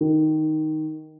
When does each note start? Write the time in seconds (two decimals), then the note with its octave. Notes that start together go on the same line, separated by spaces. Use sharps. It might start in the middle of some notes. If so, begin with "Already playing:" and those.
0.01 D#3